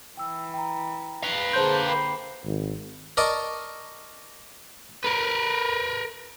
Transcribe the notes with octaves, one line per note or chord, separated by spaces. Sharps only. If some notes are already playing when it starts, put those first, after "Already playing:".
E3 G5 E6
G5 A#5
B4 F5
D3 A#3 G#4 C5 A5 C6 G6
G5 B5 C7
G#1
A#4 D5 D#5 A5 C#6
A#4 B4